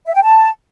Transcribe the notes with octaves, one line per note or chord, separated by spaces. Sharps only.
E5
G5
A5